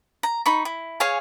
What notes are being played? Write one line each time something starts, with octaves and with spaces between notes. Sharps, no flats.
A#5
D#4 B5 C#6
E4
G#4 C#5 F5 G#5